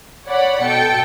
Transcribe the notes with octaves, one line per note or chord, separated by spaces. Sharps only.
C#5 D5 F#5 B5
B2 A4 G5 C#7